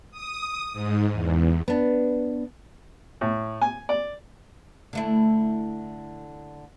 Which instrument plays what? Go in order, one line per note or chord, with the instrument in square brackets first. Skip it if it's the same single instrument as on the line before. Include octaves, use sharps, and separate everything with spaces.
[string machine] D#6
G#2
E2
[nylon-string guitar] B3 D4
[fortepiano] A2
G#5
D5
[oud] D3 A3 E4